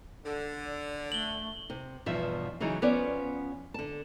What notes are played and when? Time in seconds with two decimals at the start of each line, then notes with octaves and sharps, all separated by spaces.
0.25 D3
0.65 D5
1.12 A3 F#7 G7
1.70 C3
2.06 E2 G2 B2 F3 E5
2.60 C#3 E3 F#3 D#4 G#4
2.82 F3 B3 C#4 C#5 D5
3.74 D3 A5